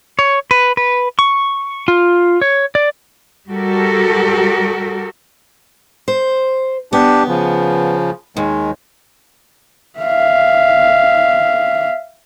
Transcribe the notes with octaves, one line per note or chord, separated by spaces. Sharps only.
C#5
B4
B4
C#6
F4
C#5
D5
G3 F#4 G4 A4 A#4
C5
B3 D4 G4
C#3 F3
D#2 D#3 G#3
E5 F5